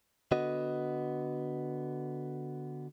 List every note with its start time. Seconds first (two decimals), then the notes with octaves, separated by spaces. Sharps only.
0.32 D3 B3 F#4 D#5